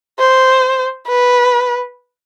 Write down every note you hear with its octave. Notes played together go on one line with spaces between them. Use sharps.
C5
B4